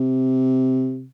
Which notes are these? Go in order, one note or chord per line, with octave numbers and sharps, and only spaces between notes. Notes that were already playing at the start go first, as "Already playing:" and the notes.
Already playing: C3